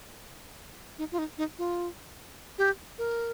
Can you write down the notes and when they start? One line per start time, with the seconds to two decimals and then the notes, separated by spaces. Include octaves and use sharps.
0.98 D#4
1.12 F4
1.18 D#4
1.38 D#4
1.58 F4
2.58 G4
2.98 A#4